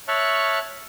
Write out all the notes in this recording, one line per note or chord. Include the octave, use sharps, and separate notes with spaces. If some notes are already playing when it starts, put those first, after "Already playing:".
C#5 E5 A5 C#6 F6 F#6